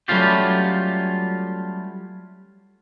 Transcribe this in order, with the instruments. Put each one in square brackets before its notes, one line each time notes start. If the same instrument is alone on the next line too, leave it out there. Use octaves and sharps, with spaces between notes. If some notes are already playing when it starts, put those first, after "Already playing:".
[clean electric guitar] F#3 G3 A3 C#4 F4 G4